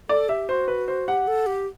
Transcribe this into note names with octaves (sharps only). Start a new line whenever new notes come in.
A4 D5
G4 E5
F#4 C5
B4
C5
G4 F#5
A4
G4